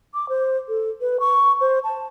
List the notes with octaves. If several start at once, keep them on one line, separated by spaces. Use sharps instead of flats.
D6
C5
A4
B4
C#6
C5
A5